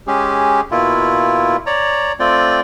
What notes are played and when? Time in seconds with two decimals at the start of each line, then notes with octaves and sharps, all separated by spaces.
0.07 G#3 C#4 G4 G#4
0.71 B2 A#3 E4 F4
1.66 C#5 D5 A#5
2.20 A3 C4 F4 D5 G5